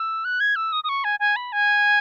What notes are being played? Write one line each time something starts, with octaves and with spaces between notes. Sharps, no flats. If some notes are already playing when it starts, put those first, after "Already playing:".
Already playing: E6
F#6
G#6
E6
D#6
D#6
C#6
G#5
G#5
B5
G#5